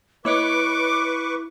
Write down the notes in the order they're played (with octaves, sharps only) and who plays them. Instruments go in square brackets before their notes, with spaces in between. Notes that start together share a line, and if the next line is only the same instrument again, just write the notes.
[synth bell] A#3 C#5 D#5 [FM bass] E4 [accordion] B4 C#6 [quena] D6